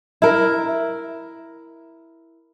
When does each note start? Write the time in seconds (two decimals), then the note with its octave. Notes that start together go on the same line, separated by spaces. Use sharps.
0.22 E4 A#4